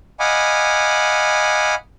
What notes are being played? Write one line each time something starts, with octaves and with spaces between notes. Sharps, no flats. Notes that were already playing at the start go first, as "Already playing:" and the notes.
D#5 F5 F#5 G#5 B5 D6